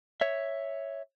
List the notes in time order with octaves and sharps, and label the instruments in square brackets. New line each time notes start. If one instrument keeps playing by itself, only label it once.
[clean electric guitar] C#5 E5